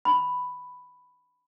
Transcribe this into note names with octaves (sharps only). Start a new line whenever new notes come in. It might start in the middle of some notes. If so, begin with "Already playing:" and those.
B5